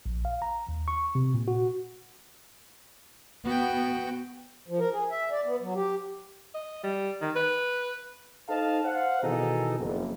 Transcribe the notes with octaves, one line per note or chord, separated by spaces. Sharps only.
A#1
F5
A#5
D#2
C#6
C3
A#2
F#4
B3 F#4 G5
F3
A#4
G#4
E5
D5
B3
F#3
G4
D#5
G3
D#3
B4
D#4 A4 C5 D#5 F5 A5
C5 F5 F#5
B2 D#3 E3 D#4 G#4 A4
F#1 F2